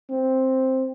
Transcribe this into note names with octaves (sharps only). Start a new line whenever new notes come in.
C4